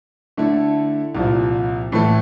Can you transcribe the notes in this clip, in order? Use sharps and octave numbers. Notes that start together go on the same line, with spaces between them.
D3 A3 E4
C2 A#2 F3
A2 E3 A3